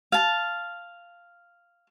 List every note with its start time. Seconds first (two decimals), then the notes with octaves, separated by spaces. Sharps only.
0.12 F5 A5